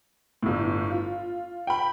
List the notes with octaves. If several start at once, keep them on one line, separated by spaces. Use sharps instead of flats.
G1 A2
F4
G5 B5